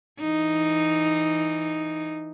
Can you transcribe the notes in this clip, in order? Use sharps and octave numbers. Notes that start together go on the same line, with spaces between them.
E3 D#4